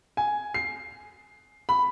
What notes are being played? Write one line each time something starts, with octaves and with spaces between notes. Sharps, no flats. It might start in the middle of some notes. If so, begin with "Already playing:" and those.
G#5
C7
B5